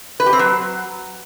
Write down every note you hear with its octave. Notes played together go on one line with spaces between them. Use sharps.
B4
G4
C4
F#3